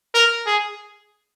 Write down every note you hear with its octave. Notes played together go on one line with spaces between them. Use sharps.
A#4
G#4